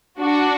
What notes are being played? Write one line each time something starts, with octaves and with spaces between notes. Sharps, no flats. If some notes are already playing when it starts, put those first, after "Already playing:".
D4 F#4